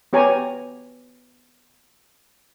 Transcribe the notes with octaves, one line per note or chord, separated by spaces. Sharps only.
B3 G4 C#5 G#5 A#5